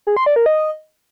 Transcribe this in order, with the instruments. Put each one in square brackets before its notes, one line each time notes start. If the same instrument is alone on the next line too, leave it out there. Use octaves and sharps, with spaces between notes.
[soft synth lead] G#4
C6
D5
A#4
D#5